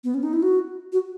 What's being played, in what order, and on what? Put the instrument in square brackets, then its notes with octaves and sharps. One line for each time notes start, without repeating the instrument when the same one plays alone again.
[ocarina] B3
C#4
D#4
E4
F#4
F#4